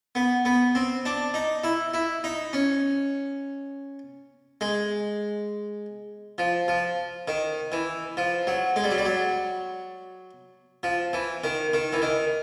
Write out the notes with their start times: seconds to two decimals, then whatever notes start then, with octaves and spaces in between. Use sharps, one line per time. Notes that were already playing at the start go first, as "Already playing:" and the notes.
0.15 B3
0.45 B3
0.75 C4
1.05 D4
1.34 D#4
1.64 E4
1.94 E4
2.24 D#4
2.53 C#4
4.61 G#3
6.38 F3
6.68 F3
7.28 D#3
7.72 E3
8.17 F3
8.47 F#3
8.76 G#3
8.84 G3
8.91 F#3
8.98 G3
9.05 F#3
10.83 F3
11.13 E3
11.44 D#3
11.74 D#3
11.93 E3
12.02 D#3